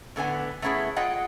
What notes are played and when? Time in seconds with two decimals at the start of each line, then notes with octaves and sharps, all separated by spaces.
0.16 A2 D3 B3 G#5
0.62 A3 B3 C#4 E4 F4 G#4
0.96 F4 G#4 D#5 F#5 G5